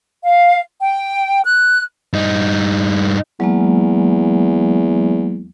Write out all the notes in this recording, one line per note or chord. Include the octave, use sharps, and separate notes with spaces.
F5
G5
F#6
G2 D#4
E2 F#3 G#3 A#3